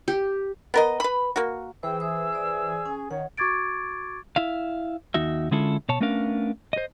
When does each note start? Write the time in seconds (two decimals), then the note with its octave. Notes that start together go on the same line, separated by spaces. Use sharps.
0.08 G4
0.74 B3 A#4 D#5
1.00 B4 B5
1.36 A#3 F#4
1.83 E3 G#4 C5 G5 E6
2.00 G#4 C5 E5 D#6
2.33 C5 D5
2.86 C#4 G#5
3.11 D#3 C#5 F#5
3.37 F#4 C#6 D6 G#6 A6 D7
4.36 E4 E5 F5
5.14 D#2 D#4 F#4 E5
5.51 D3 G#3 C#4 E4 F4 A4
5.89 B2 C#5 A5
6.00 A3 B3 C#4 D4 A#4 F5
6.73 C5 D#5